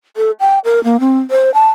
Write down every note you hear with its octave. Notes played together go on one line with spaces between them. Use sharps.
A4
G5
A#4
A#3
C4
C5
A5